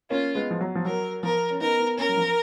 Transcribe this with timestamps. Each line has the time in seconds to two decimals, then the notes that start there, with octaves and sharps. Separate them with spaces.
0.10 A#3 C#4 F4
0.35 G#3 B3
0.51 F3
0.61 F#3
0.75 F3
0.85 F#3 A#4
1.23 F3 A#4
1.50 C#4
1.61 B3 D#4 A#4
1.79 B3 D#4
1.98 A#3 C#4 A#4
2.09 F#3
2.17 F3